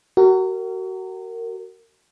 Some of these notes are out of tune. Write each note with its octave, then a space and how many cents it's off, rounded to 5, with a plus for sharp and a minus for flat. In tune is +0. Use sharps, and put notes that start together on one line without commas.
F#4 +30 A#4 -25